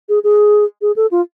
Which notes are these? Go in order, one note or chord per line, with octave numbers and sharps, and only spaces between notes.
G#4
G#4
G#4
A4
F4